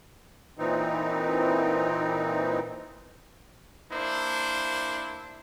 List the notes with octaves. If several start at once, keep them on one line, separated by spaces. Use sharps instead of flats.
A#2 E3 C4 D#4
A#3 D4 E4 C5